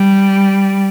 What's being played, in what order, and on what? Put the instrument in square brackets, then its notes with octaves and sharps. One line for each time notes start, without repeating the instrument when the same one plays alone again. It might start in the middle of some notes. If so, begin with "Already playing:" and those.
Already playing: [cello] G3